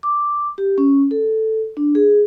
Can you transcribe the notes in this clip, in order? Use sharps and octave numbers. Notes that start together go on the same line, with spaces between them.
D6
G4
C#4
A4
D4
G#4